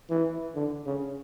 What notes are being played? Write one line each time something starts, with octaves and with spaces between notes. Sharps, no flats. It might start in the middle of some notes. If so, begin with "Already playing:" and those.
E3
D3
C#3